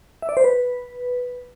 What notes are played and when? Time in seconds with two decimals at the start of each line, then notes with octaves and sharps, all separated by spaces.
0.22 E5
0.29 D5
0.37 C5
0.44 B4